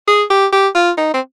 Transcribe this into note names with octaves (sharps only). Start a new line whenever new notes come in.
G#4
G4
G4
F4
D#4
C4